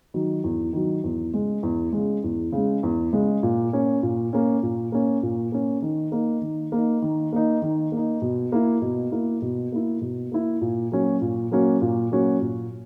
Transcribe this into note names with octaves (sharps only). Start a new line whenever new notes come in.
D#3 F#3
E2
D#3 F#3
E2
C#3 G#3
E2
C#3 G#3
E2
C#3 G#3
E2
C#3 G#3
A#2
A#3 C#4
A#2
A#3 C#4
A#2
A#3 C#4
A#2
A#3 C#4
D#3
A#3 D#4
D#3
A#3 D#4
D#3
A#3 D#4
D#3
A#3
D#4
B2
A#3 E4
B2
A#3 E4
B2
A#3 E4
B2
A#3 E4
A#2
F#3 A#3 C#4 F#4
A#2
F#3 A#3 C#4 F#4
A#2
F#3 A#3 C#4 F#4
A#2